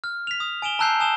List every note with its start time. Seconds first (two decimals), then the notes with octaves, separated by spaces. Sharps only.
0.04 F6
0.27 B6 F7
0.40 D#6
0.62 G#5 D7 E7 G7
0.79 A5 A#5 E6 F#6 G6 C7
1.00 G#5 D#6 E7 G7